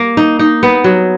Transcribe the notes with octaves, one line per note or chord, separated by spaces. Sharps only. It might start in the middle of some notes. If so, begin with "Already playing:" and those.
Already playing: A#3
D#4
D#4
B3
F#3